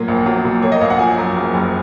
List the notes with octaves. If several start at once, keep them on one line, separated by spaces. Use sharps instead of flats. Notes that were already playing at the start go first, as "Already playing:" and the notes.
Already playing: A#2 F#3 A#3
A#1
F#3
A#2
A#3 C#5
D#5
A#1 F5
F#5
F3 G#5
F#2
F#1
F#1